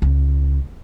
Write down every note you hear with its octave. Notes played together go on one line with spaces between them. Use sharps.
C#2